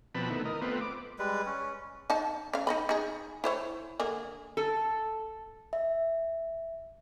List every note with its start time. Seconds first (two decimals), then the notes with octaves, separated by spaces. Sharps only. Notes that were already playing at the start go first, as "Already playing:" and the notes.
0.15 B2 F3 C4 B4 A5 B5
0.30 D#3 A3 B3 E4
0.45 A#4 D#5
0.62 A3 B3 C4 F4 B4
0.81 D6
1.19 G3 G#3 B4
1.46 C#4
2.10 D#4 F5 A5
2.53 C#4 F5
2.67 D#4 D#5 B5
2.89 D#4 G#4
3.44 E4 C5 C#5
4.00 D3 A#3 G#4
4.57 A4
5.73 E5